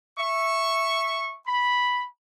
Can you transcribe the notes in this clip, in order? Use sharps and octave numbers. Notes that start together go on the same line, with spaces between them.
E5 C#6
B5